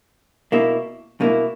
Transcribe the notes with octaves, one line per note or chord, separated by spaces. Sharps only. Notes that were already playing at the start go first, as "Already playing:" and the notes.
B2 A#3 E4
B2 A#3 E4